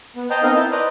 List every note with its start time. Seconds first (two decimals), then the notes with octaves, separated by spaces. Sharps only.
0.16 B3
0.30 C5 D#5 G5 A5 A#5 C6
0.43 B3 C4 D#4 A#4 D#5 F5
0.56 E4 A5 G6
0.72 B4 C5 D5 D#5 A#5